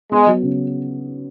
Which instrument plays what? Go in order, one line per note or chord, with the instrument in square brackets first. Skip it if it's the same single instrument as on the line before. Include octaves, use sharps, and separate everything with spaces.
[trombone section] G#3 [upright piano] B3
[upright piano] F#3
C#3